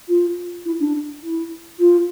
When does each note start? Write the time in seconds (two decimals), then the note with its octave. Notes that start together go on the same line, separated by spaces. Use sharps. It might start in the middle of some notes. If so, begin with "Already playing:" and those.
0.08 F4
0.65 E4
0.79 D4
1.23 E4
1.79 F4